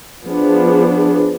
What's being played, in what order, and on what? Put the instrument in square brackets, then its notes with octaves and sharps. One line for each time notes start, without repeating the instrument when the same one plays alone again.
[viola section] F3 B3 D4 G#4